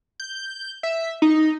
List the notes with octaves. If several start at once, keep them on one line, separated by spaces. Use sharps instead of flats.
G6
E5
D#4